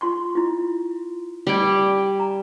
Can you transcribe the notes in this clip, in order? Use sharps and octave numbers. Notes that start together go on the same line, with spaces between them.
F4 C6 C#6
E4 F4
G3 C#4 D5 G5
A#5